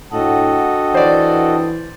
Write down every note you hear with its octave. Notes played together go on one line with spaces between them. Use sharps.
A2 D4 F#4 A4 D#5 F#5 G5
E3 C5 D5